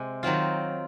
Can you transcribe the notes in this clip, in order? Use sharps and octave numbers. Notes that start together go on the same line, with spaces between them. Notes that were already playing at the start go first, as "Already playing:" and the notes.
Already playing: C3 G#3
D#3 F#3 C4 F4